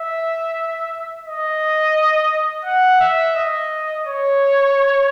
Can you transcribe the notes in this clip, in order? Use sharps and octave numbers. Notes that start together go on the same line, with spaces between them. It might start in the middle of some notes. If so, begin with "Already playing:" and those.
Already playing: E5
D#5
F#5
E5
D#5
C#5